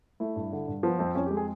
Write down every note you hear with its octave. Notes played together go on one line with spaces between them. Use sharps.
A3 E4
G2
D3
G2
F3 B3
F2 C4
F2 C#4
G4
G#3
G#4